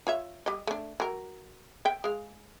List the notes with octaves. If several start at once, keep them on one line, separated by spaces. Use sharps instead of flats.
F4 C#5 E5
G3 D#5
A3 D4
F#3 A#4
E5 G5
G#3 F5